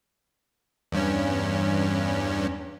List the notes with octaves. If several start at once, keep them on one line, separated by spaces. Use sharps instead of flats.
E2 G2 C#4